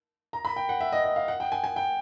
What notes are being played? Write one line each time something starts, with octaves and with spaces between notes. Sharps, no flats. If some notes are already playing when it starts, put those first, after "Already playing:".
A#5
B5
G5
F#5
E5
D#5
D#5
F5
F#5
G5
G#5
G#5
G5